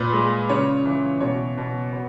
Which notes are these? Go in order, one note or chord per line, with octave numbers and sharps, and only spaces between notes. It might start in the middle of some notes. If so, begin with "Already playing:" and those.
Already playing: A#2 B4
G#3
C#3 C#5
E3
B2 C#5
B2
B3